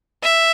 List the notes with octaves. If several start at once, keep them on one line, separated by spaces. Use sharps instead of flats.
E5